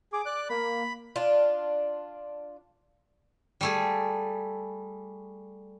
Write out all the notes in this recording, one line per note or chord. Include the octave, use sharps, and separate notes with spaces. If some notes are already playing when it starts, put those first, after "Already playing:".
G#4 D6
D5 F#6
A#3 B5
D4 F4
G3 A3 G#4